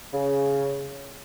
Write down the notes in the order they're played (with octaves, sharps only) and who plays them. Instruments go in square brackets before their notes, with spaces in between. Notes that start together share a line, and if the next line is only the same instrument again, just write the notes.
[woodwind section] C#3